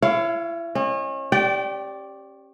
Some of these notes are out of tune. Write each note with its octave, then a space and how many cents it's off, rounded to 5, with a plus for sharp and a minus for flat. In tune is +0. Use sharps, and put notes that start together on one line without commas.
E4 +35 C#5 +0 F5 +0
C#4 -35 D#5 -30
G4 +0 D5 +0 G5 -30